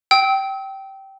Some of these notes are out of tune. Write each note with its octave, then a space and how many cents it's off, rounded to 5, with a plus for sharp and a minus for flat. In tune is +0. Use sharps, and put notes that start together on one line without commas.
G5 -15 E6 -40